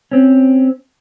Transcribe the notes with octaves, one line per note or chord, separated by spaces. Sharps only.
C4 C#4